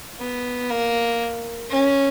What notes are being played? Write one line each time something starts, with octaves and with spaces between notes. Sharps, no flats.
B3
A#3
C#4